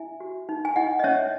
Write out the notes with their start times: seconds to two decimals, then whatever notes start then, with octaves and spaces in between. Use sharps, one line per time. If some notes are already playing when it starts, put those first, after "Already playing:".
Already playing: E4 E5 G#5
0.20 F#4
0.49 D#4
0.65 G#5
0.76 E4 D#5 F#5
0.99 D#5
1.04 C#4 C#5 E5